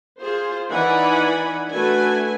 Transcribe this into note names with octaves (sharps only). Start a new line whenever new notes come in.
F4 G#4 C5
E3 D#4 D5 F#5 G#5 B5
A3 D4 F#4 A4 B4 G#5